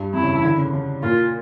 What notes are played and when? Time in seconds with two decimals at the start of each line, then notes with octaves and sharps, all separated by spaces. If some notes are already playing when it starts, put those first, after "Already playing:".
Already playing: G2
0.14 F2 E4
0.23 C#3
0.33 E3
0.43 D3
0.58 C#3
0.73 C#3
1.03 A#2 F4